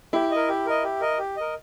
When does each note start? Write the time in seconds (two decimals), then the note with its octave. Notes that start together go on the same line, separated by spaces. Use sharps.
0.13 E4 G4
0.31 D#5
0.36 A#4
0.49 G4
0.66 A#4 D#5
0.84 G4
1.01 A#4 D#5
1.18 G4
1.37 A#4 D#5